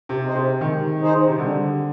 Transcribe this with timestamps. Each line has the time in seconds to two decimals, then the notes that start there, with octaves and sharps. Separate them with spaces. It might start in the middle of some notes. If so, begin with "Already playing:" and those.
0.09 C3
0.22 D#4 G#4 C5
0.35 C3
0.61 D#3 G#3
1.00 D#4 G#4 C5
1.28 C3
1.39 D3 G3